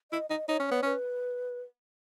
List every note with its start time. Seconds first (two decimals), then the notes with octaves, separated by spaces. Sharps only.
0.12 E4 D#5
0.30 D#4 D#5
0.48 D#4 C#5
0.60 C#4
0.66 B3 C#5
0.82 C#4 B4